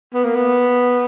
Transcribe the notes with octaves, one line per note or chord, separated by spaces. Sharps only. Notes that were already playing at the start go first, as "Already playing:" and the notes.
B3
A#3
B3